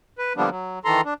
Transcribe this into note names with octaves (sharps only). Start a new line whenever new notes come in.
B4
D3 F3 G3 A#3 B3 D4
F#3
D#3 E3 A4 A#5 C6
D4